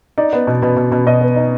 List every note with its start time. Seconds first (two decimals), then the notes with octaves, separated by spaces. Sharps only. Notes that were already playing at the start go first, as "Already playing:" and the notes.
0.18 D#4 D5
0.33 B3
0.47 B2
0.62 B2
0.77 B2
0.92 B2
1.06 B2 D#5
1.21 B3
1.36 D#4